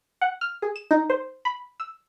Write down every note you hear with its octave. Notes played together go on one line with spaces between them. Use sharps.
F#5
F6
G#4
E7
D#4
C5
B5
E6